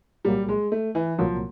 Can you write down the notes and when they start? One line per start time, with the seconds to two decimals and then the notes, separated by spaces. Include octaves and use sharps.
0.25 C2 A#2 F#3 G3 A#3
0.48 G#3
0.72 A3
0.95 E3
1.18 C2 A#2 F3 F#3 A#3